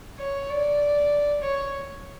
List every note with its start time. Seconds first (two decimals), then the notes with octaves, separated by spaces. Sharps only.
0.19 C#5
0.50 D5
1.42 C#5